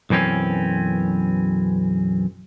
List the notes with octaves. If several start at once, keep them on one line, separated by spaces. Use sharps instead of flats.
B1 F#2 E3 C4 C#4